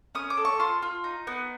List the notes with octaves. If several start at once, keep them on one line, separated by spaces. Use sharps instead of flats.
C#4 D#6
D6
A4
C#6
F4 C6
F4
D#4
B3